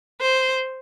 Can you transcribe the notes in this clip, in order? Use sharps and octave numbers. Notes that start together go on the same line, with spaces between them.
C5